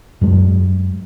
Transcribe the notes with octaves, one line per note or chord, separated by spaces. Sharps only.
F#2 F#3 G#3